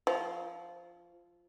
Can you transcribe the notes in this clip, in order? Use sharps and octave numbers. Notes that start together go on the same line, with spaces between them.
F3